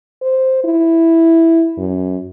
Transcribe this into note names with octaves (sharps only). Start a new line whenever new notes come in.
C5
E4
F#2